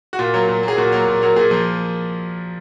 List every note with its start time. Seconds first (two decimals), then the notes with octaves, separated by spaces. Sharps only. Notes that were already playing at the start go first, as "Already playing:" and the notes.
0.13 F#4
0.19 A#2 F4
0.34 F#3 A#3
0.48 A#2
0.63 F#3 A#3 G#4
0.77 A#2 F#4
0.92 F#3 A#3
1.07 A#2
1.22 F#3 A#3
1.36 A#2 G#4
1.51 F3 A#3